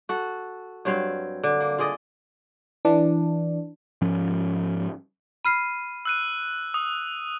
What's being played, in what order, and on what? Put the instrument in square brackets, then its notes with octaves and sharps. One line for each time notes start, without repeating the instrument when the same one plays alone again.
[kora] F#4 A4
G2 F#3 C4 F5
D3
A#3
F4 G#4 D5 D#5
[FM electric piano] E3 D4
[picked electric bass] G#2 F3 C#4
[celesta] B5 F6 C7 [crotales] D#7
[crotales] E6 F#6 D#7
D#6